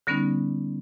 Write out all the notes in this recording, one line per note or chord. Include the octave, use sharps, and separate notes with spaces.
D3 G3 B3 C#4 D#4